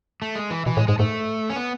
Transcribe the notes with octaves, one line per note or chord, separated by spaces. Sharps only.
A3
G#3
E3
B2 E3
A2 G#3
G#2 G#3
G#2 A3
C#4
B3